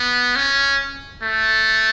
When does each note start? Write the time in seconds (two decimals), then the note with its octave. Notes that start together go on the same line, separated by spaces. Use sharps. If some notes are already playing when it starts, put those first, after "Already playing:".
Already playing: B3
0.36 C#4
1.23 A3